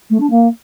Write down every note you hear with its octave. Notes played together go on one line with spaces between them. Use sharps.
A3
D4
A#3